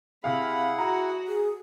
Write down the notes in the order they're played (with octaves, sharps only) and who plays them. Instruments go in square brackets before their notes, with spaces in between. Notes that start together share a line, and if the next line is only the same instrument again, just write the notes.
[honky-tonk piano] C3 F5 [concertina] E4 G#4 F#5 [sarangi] B5
[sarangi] F#4 [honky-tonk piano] A#5
[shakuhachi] G#4